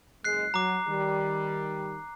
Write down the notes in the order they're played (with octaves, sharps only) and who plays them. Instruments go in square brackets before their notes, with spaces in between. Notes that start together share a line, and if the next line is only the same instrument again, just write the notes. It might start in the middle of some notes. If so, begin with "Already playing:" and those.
[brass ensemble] F#1 G#3 [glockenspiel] F#6 C7
[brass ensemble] F#3 [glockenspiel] A#5 D6
[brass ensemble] D#3 G3